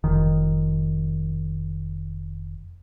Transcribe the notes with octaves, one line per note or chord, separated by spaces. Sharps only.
F1 D#3